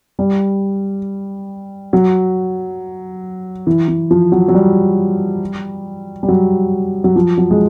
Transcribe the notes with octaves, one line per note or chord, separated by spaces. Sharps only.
G3
F#3
E3
E3
F3
F#3
F#3
G3
G3
F#3
F#3
F3
F#3
G#3